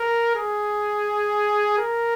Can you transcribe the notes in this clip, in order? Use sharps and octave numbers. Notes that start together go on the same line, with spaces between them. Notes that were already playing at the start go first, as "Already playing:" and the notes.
Already playing: A#4
G#4
A#4